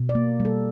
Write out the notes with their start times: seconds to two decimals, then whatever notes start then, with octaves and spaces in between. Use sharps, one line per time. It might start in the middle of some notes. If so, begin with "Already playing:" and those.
Already playing: B2
0.09 D5
0.15 A#3
0.40 G3
0.45 A4